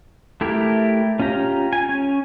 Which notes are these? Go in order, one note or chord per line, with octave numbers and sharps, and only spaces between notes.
A3 E4 G4 A#4
C#4 F4 G4 A#5
G#5
C#4